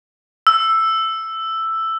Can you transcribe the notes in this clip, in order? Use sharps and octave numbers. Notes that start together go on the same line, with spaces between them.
E6